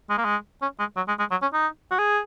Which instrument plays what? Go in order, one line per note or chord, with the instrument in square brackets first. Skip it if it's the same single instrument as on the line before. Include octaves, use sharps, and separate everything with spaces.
[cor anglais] G#3
A#3
G#3
C#4
G#3
F#3
G#3
G#3
F#3
C#4
D#4
F#4
G#4